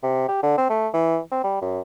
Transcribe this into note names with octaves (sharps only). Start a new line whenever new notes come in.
C3
G4
D3
C4
A3
E3
C4
G3
F#2